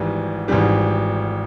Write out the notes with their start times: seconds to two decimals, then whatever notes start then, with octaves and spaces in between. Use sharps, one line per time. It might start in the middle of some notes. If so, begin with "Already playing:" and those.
Already playing: G#1 G#2 E3 G3
0.48 G#1 G#2 E3 G3